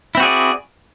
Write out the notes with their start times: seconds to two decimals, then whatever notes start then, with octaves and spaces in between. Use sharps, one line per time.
0.15 E4
0.17 C4
0.20 F#4
0.22 G#4
0.25 D5